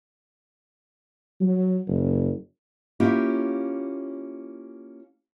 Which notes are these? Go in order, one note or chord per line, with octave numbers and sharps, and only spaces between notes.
F#3
F#1
A#3 C#4 E4 F4 G4